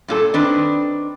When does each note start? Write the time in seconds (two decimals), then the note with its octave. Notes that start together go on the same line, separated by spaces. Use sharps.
0.08 G2 A#2 A4
0.34 D#3 C4 D4 B4